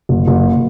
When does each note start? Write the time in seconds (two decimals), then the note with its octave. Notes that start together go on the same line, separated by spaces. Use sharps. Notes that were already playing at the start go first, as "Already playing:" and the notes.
0.09 F#1
0.27 F#1